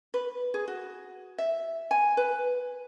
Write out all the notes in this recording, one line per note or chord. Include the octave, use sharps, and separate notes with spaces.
B4
G#4
F#4
E5
G#5
B4